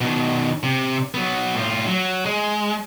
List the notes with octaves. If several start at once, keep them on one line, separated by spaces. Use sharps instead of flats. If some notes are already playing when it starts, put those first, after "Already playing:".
B2 D#3
C3
F#3 B3
A2 F4
F#3
G#3